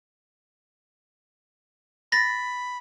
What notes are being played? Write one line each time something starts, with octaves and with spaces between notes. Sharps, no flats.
B5 A6 A#6